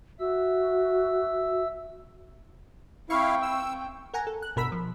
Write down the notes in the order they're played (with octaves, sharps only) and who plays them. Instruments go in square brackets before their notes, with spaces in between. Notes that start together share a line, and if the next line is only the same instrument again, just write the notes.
[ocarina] F#4 [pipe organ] E5 E6
[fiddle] C4 G5 [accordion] E4 F5 [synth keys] C#6
[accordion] E6
[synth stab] A#4 F#5 G#5 A#5
A4
F#6
G1 B2 A#4 B5 E6 B6
F3